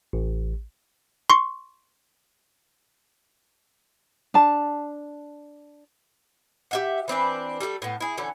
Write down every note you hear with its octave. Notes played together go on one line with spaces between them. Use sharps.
A1
C6 C#6
D4 A5
G4 E5 F#5
E3 C4 D4 B4
G3 A3 F#4 A4
A2 B3
E4 G#4
D3 E3 C#4 A4